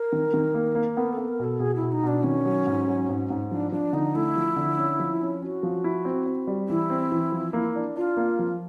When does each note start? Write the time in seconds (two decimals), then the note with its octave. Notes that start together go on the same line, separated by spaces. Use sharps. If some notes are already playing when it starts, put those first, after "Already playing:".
Already playing: A#4
0.13 D#3
0.34 D#3
0.54 A#3
0.75 A#3
0.96 B3 A#4
1.13 B3 A4
1.29 A#4
1.39 B2 A4
1.60 B2 G#4
1.76 E4
1.82 B2
1.92 D#4
2.03 B2 D4
2.23 D#3 C#4
2.45 F#3
2.67 G#2
2.88 F#3
3.09 G#2
3.30 G#2
3.51 F3 D4
3.72 F3 D4
3.93 D3 D#4
4.15 A3 E4
4.36 F3
4.56 D3
4.78 C#4
5.00 F3
5.21 C#4
5.42 C#4 F#4
5.63 F3
5.84 E4
6.05 C4
6.26 C4
6.47 G3
6.68 E3 E4
6.90 C4
7.12 E3
7.32 F3
7.53 A#3
7.76 D4
7.96 D4 F4
8.17 A#3
8.39 F3